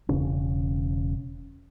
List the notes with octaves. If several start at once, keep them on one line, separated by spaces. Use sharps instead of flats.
E1 C#3 C#4